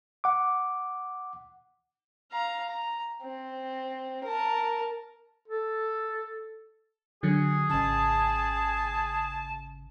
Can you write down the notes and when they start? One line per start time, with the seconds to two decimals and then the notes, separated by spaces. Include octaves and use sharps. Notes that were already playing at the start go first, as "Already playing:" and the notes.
0.24 F#5 D6
2.32 F5 A#5
2.69 A#5
3.22 C4
4.24 A#4 A5
5.48 A4
7.23 D3 F#3 G#4
7.70 G#1 C#3 A5